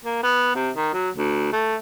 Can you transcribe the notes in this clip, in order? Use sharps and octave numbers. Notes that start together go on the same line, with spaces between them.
A#3
B3
C3
D#3
F#3
D2
A3